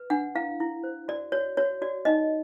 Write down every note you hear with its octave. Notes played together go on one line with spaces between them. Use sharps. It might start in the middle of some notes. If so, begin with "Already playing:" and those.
Already playing: B4
D4 F#5
E4 F5
E4
C5
F#4 D5
F#4 C#5
F#4 C#5
F#4 D5
D#4 D#5